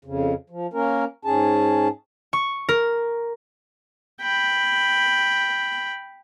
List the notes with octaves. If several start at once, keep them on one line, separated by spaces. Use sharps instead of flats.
F2 C#3
F3
A#3 C#4 A#4
G#2 C#4 G#4 A5
C#6
A#4
G5 B5